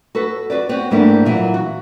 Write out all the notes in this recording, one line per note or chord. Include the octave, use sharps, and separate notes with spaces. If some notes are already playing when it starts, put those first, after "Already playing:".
F#4 A4 B4
F#4 G#4 B4 D5
B3 C4 F#4
G#2 E3 G3 A3 A#3 D4
A#2 E3 F#3
F#4